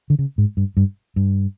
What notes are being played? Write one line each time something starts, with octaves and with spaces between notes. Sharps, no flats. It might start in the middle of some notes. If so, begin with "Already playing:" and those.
D3
C#3
G#2
G2
G2
G2